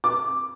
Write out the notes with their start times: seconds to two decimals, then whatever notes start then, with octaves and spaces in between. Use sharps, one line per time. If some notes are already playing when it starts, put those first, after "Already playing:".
0.04 D6